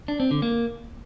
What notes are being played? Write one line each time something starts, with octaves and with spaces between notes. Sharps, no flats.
D4
C4
D3
A#3